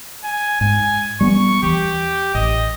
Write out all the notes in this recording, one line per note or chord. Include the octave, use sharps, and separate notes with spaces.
G#5
G#2 G#5
G3 A#3 B3 C#6
D#2 E3 G4
A1 D#5